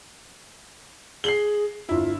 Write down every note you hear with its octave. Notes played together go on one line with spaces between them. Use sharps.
G#4 C7 F#7 G7
G1 E4 F4